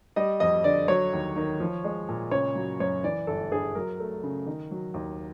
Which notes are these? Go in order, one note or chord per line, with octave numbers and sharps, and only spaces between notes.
G3 D#5
F2 D#5
D3 D5
F#3 C#5
D#2
D#3
F3
G#3
A#2
C#3 C#5
F#3
F#2 C#5
E3 D5
G1 A4
G2 G#4
F#3 A#4
A3
C#3
D#3
F#3
D#2